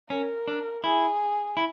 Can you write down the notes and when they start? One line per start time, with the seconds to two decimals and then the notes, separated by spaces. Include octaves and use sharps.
0.10 C#4 A#4
0.48 D4
0.84 E4 G#4
1.57 E4